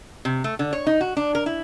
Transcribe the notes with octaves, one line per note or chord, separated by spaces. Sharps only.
C3
A3
D3
C#5
D#4
F#4
D4
A#4
E4